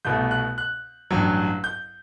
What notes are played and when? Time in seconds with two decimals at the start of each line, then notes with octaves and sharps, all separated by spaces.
0.05 C2 B2 A3 G6
0.31 F#6
0.58 F#6
1.11 A1 G2 F#3
1.64 G6